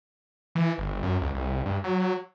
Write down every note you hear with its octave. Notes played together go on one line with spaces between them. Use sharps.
E3
G1
F#2
C#2
C2
G2
F#3